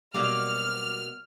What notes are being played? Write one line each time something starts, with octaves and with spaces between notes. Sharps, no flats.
B2 F#3 G3 A#3 D5 F6